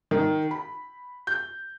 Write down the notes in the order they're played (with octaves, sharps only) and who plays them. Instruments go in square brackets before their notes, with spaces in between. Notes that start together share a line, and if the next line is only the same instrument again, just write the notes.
[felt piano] D#3
B5
G6